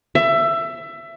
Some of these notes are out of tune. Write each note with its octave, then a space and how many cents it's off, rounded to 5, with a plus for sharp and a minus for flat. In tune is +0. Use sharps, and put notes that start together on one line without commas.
E5 +20